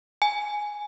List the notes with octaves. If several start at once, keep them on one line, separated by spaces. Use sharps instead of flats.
G#5